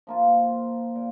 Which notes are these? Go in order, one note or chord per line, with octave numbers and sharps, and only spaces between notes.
F3 A#3 F4
A#2